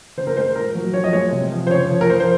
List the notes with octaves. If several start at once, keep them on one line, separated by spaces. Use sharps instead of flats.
C#3 C5
A#4
G#3 C5
A#2 A#4
F#3
F3 C#5
D#5
G#3 C#5
C3
F3
C5
C#3 C#5
F3
A#4
F3 C5
C5